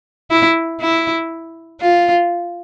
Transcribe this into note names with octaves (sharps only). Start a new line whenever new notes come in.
E4
E4
F4